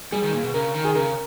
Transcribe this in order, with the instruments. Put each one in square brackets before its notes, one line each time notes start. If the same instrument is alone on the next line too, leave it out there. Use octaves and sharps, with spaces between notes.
[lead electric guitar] G3 [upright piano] G#4
[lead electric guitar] D#3
A#2
B2
[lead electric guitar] C#3 [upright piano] A#4
[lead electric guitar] D#3
[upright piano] G#4
[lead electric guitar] C#3 [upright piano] A#4